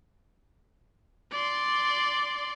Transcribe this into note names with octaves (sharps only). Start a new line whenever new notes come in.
D5 C6